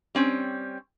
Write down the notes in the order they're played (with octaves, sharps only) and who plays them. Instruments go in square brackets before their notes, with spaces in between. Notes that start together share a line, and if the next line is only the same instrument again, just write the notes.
[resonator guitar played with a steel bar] G3 C4 C#4